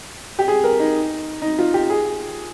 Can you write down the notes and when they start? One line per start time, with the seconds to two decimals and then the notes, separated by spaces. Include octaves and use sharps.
0.39 G4
0.48 G#4
0.64 A#4
0.79 D#4
1.42 D#4
1.59 F4
1.74 G4
1.90 G#4